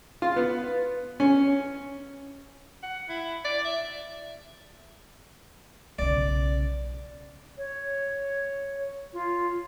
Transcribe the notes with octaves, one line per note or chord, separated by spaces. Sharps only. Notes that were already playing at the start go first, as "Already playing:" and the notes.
F4
B3
C#4
F#5
E4
D5
E5
B1 C#3 D5
C#5
F4